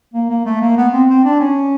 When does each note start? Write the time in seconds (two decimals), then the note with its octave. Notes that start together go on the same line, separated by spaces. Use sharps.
0.14 A#3
0.30 A#3
0.45 A3
0.61 A#3
0.77 B3
0.93 C4
1.09 C4
1.25 D4
1.40 C#4